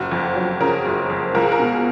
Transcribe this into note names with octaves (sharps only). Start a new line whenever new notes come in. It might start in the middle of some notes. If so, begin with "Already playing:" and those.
Already playing: F#1 F#4
F2
F#3
C#3 A#4
F#1
F2
C#2 A#4
G#4
A#4
B2